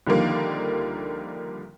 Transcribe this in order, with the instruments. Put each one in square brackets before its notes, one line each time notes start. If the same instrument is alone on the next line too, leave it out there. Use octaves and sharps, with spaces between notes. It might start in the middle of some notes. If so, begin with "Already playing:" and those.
[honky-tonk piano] C2 D3 D#3 F3 G3 A#3